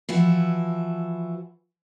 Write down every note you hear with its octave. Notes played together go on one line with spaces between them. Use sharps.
E3 F3 E4 F#4